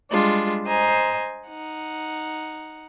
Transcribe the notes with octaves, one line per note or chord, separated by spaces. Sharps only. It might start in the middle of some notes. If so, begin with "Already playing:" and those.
G3 G#3 D4 F4
C5 D#5 G#5 A#5
D#4 F#5